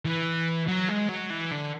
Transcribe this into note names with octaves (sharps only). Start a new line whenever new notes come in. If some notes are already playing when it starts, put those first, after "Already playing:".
E3
F#3
G#3
F#3
E3
D3